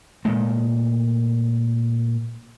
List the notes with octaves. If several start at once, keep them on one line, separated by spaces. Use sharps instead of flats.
A#2 G#3 A3